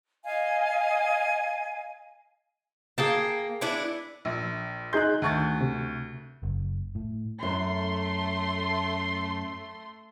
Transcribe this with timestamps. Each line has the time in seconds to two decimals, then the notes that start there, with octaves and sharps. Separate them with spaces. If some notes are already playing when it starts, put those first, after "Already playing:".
0.23 D#5 F5 G#5
2.98 A#3 G#4 G5 A5
3.61 B3 D4 E4
4.25 A#1
4.93 D#4 G#4 C6 F#6 G6
5.22 D2 D#3 C#6 A6
5.61 C3
6.43 F#1
6.95 A2
7.43 F#2 A3 C6